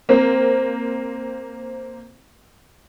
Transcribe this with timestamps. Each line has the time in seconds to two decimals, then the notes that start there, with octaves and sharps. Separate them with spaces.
0.09 A#3 C4